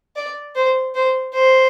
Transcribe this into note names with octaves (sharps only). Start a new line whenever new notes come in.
D5
C5
C5
C5